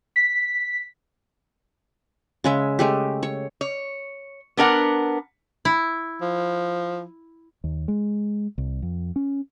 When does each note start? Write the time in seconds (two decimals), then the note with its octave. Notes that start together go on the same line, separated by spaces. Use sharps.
0.16 B6
2.44 C#3 G#3 E5
2.79 G#3 A3 G4
3.23 C#5
3.61 C#5
4.57 B3 D4 A#4 F#5
5.65 E4
6.21 F3
7.64 D#2
7.88 G#3
8.58 C2
8.82 F2
9.16 C#4